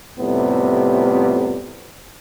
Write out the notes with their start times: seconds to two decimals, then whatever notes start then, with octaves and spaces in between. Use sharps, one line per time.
0.18 F2 A2 C3 G3 B3